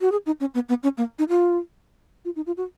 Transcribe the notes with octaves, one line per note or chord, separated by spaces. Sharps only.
F#4
G#4
D#4
C#4
B3
B3
C#4
A#3
D#4
F4
F4
D#4
F4
F#4